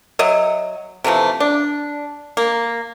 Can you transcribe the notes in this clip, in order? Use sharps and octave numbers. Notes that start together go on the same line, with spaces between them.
F#3 D#5 E5
C3 E3 F3 A3
D4
A#3